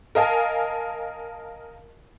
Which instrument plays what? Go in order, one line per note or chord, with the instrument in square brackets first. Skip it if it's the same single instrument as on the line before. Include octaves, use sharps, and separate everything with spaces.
[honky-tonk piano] A#4 D#5 F5 G#5 A5